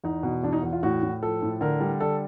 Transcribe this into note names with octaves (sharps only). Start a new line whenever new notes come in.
E2 D#4
B2
E2 D4
D#4
E2
F4
A2 F#4
A2
F3 A4
A2
D3 A#4
G3
D3 A4